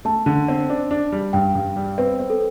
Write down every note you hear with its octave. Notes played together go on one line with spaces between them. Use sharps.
A3 A5
D3
C4
D4
D4
G3
G2 G5
G2
G3
C4 B4
C4
A4